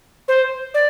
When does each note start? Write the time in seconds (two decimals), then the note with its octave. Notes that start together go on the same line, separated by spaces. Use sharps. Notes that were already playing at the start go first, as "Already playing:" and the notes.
0.28 C5
0.74 D5